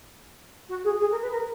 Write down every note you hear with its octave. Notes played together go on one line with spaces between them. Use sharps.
F#4
G#4
G#4
A#4
B4
A#4